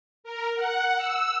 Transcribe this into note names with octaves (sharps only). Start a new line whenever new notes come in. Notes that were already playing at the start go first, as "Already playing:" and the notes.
A#4
F#5
E6